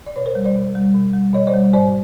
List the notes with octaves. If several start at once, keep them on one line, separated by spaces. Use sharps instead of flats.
D5
B2 B4 C#5
A#4 C5
G3
C5 D5
B2
G3
B2
G3
B2 C#5 D#5
C5 D5
G3
G#2 C5 D5